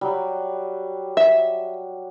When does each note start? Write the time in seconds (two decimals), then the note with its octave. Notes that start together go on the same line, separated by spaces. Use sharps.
0.01 F#3 G3
1.17 E5